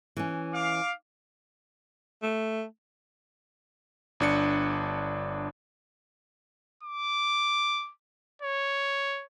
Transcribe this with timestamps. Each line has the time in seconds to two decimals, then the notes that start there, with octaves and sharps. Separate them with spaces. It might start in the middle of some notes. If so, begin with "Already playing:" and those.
0.17 E3 C#4
0.53 F5 D6
2.22 A3
4.20 G1 D4 C#7
6.83 D6
8.42 C#5